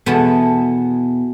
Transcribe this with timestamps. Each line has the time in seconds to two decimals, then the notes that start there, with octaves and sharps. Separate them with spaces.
0.06 E2 B2 B3 E4 A4